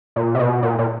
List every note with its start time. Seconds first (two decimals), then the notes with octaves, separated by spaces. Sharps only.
0.16 A#2
0.35 C3
0.39 B2
0.63 A#2
0.79 A#2